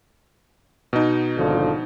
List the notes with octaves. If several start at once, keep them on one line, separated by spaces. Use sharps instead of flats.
B2 D#4
G#1 D3 F3